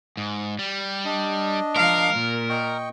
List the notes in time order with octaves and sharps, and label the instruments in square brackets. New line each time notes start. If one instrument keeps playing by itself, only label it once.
[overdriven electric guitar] G#2
G3
[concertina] D4 D#5
[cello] F3 F5 [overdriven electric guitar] A#4
[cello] A#2
[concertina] D#5 G5 C#6